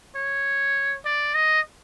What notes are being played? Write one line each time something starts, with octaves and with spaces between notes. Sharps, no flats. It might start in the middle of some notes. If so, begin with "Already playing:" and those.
C#5
D5
D#5